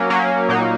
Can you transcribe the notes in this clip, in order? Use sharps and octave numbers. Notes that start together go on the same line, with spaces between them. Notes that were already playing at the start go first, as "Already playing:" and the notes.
Already playing: F#3 A#3 C#4
F#3 A#3 C#4
A#2 F#3 A#3 D#4